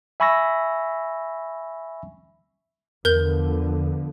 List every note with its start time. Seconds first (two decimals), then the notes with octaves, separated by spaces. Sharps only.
0.20 E5 G#5 B5 C#6 E6 A#6
3.05 E2 D3 F3 B3 A#4 G6 G7